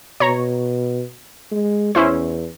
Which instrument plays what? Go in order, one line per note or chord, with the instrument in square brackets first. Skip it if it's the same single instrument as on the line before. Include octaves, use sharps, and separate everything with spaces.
[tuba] B2 [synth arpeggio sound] C#5 A#5
[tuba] G#3
[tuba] E2 [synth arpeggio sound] C#4 E4 C5